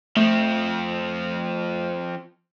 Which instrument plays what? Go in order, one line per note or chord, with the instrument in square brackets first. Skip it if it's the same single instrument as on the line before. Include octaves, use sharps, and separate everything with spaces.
[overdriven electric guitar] F3 C4 [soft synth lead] A3